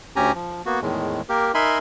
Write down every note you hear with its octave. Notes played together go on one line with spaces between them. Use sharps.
D2 C#4 G4 G#5 A#5
F3
A#3 B3 F#4
E2 A2 D#3 G#3
A#3 G4 A#4
D#4 A#4 E5 G#5 B5 C6